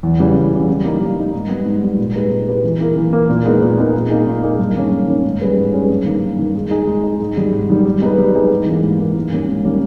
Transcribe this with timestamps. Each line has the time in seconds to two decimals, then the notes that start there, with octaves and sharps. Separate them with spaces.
0.03 E2
0.20 C#3 E3 G3
0.36 E2
0.51 C#3 E3 G3
0.68 G3
0.84 A#3 D#4
1.00 G3
1.17 A#3 D#4
1.34 G#2
1.49 G3 B3
1.65 G#2
1.82 G3 B3
1.98 A#2
2.14 G#3 D#4 G4 B4
2.30 A#2
2.47 G#3 D#4 G4 B4
2.64 E3
2.80 A#3 E4 A#4
2.97 E3
3.13 A#3 E4 A#4
3.29 A#2
3.45 G#3 B3 D#4 A#4
3.61 A#2
3.78 G#3 B3 D#4 A#4
3.93 A#2
4.10 A#3 D#4 G#4
4.27 A#2
4.42 A#3 D#4 G#4
4.59 G2
4.76 D#3 A#3 C#4
4.91 G2
5.07 D#3 A#3 C#4
5.24 G#2
5.41 G3 C#4 G#4 B4
5.57 G#2
5.73 G3 C#4 G#4 B4
5.90 G2
6.06 D#3 A#3
6.23 G2
6.38 D#3 A#3
6.55 G#3
6.71 D#4 G#4
6.87 G#3
7.03 D#4 G#4
7.20 G#2
7.37 D#3 G3
7.53 G#2
7.69 D#3 G3
7.85 G3
8.02 B3 D#4 G#4 B4
8.18 G3
8.35 B3 D#4 G#4 B4
8.51 G#2
8.66 E3 A#3
8.84 G#2
8.99 E3 A#3
9.15 G#2
9.32 D#3 G3 A#3 C#4
9.49 G#2
9.64 D#3 G3 A#3 C#4